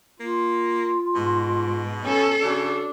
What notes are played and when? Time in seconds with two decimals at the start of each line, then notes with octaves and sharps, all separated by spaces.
0.20 A#3 F4
1.15 G#2 B2
2.05 C#4 A4
2.43 C#3 D4 F#4